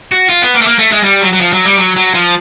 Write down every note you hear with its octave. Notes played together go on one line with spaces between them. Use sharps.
F#4
F4
B3
A#3
A3
A#3
A3
G#3
G3
F#3
F#3
F3
F#3
G3
F#3
F#3
F3